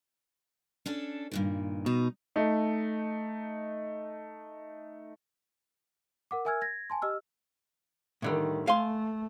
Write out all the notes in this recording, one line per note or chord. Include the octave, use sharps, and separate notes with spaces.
C#4 D4 A4
G2 A#2 D#3
B2 D#4
A3 D#4
A#4 F#5 D6
A#4 E5 G#5 E6 F6 G#6
G#6 A#6
G#5 A5 C6
G4 D#5 E6 F6
A2 D3 D#3 G3
A3 F5 G#5 C6